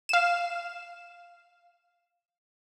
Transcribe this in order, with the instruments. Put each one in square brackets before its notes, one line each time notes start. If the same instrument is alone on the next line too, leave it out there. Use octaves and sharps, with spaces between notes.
[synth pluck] F5 E7